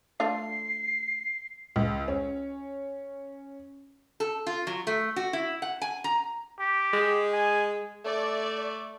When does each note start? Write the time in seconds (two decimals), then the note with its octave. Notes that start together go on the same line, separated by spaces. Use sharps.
0.20 A3 D4 F4 C7
1.76 C#2
2.08 C#4
4.20 A4
4.47 F4
4.67 F#3
4.87 A3
5.16 F#4
5.33 E4
5.62 F#5
5.82 G#5
6.04 A#5
6.59 G4
6.93 G#3
7.32 G#5
8.05 A3 D5